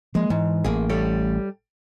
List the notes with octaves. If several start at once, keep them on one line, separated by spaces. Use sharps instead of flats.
F3 G#3 A#3
G#2 E3
A1 A3 A#3 G#4
G3 A4 C#5